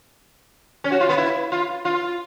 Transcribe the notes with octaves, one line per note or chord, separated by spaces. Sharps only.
C#4
F#4
F4
B3
E4
F4
F4